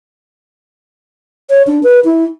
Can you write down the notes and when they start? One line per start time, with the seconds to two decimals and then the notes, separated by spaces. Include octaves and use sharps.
1.50 C#5
1.67 D4
1.84 B4
2.05 E4